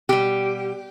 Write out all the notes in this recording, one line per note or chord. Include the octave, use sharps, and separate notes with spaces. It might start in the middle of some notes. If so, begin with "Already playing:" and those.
B2 G3 G4